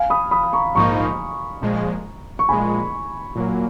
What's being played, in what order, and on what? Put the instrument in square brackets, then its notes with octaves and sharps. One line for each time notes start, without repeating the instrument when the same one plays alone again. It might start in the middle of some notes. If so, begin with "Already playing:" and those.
Already playing: [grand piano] F5 G#5
B5 D#6
B5 D#6
D#6
A#5 C#6
[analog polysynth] A#1 G#2 F3 A#3 D#4 [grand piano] A#5 C#6
[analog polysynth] A#1 A#2 F3 G#3
[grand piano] C#6
[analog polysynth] A#1 A#2 F3 G#3 [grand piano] G#5 B5
[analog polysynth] A#2 F#3 A#3